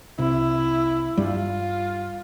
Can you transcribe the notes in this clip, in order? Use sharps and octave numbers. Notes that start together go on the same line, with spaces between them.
C2 C3 E4
G2 G3 F4